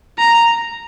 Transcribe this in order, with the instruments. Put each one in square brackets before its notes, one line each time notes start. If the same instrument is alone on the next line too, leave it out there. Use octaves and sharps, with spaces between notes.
[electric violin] A#5